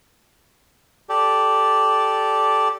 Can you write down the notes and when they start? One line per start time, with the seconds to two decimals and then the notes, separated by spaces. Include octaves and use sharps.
1.09 G4 A4 D5